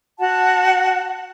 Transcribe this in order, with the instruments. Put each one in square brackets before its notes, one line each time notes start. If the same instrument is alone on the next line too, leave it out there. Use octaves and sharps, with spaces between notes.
[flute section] F#4 F#5 A5